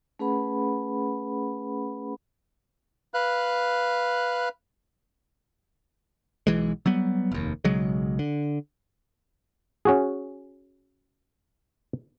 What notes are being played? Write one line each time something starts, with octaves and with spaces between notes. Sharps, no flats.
A3 C#4 G#4 B4 F#5 B5
B4 F5 F#6
B1 E3 G#3
F#3 G3 B3
F1 D#2
B1 C#3 F#3 G#3
D3
C#4 F#4 G#4